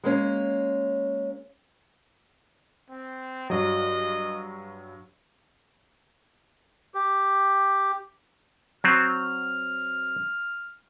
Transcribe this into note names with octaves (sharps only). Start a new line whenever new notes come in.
G#3 A#3 C#4
C4
G2 F#3 D#5
G4
F#3 C4 F6